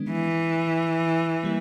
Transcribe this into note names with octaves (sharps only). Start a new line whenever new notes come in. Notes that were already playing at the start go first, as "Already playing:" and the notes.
Already playing: D#3 G#3 B3 D4
E3
G3 A#3